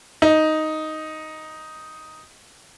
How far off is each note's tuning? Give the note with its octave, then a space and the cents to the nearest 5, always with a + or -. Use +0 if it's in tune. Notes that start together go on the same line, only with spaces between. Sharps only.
D#4 +5